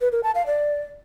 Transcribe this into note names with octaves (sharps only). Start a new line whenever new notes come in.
B4
A#4
A5
F5
D5